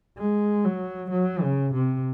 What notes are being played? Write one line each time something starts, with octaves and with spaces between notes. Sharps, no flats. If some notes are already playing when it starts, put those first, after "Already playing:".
G#3
F#3
F#3
C#3
C3